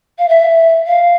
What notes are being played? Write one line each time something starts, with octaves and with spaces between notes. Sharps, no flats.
F5
E5
F5